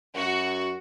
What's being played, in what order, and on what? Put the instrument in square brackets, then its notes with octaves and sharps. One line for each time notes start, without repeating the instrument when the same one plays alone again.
[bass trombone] F#2 [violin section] F#4